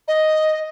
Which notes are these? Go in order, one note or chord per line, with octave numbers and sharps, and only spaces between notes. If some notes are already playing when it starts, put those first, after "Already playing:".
D#5